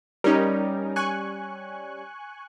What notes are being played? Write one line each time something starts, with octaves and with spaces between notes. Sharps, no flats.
G3 C#4 D#4 A#4
G#5 C#6 F#6